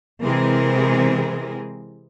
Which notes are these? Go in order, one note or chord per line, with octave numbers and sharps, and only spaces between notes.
C3 E3 G#3 C4 G#4 A#4